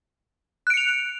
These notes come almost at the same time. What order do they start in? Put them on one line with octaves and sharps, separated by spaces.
F#6 D7 C#7 F7